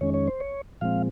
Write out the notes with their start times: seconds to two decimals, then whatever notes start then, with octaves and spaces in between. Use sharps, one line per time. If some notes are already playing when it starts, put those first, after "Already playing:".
0.01 F2 D#3 G#3 C#4 C#5
0.14 C#5
0.27 C5
0.40 C#5
0.81 A#2 F3 G#3 C4 F5